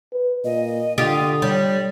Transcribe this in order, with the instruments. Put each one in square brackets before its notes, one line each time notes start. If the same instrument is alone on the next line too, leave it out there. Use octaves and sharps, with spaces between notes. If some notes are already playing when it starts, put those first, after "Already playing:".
[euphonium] B4
[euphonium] A#2 [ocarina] D#5
[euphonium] D3 [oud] F4 G4 [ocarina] D#6
[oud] G3 [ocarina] C#5